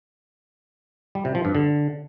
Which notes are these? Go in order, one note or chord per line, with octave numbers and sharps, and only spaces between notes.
G3
C3
F3
G2
D3